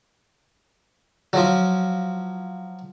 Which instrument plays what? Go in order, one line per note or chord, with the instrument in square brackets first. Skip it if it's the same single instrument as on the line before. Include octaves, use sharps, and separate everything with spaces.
[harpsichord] F3 F#3